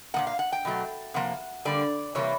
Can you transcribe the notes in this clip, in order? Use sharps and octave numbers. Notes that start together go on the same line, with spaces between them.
A#2 F3 A#3 F#5
F5
F#5
G5
B2 F#3 A3
C3 F3 A#3 F#5
D3 G3 A#3 D5
C3 E3 G3 A#3 C#5